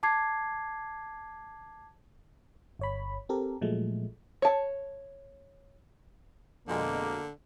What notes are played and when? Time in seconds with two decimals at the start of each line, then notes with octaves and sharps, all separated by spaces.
0.03 A5 D6 G#6 C7
2.79 G1 C#5 B5
3.29 C4 G4 A4 A#4
3.61 A#2 F3 F#3 G#3 A3
4.42 C#5 A5
6.68 F2 B2 D3 G#3 A#3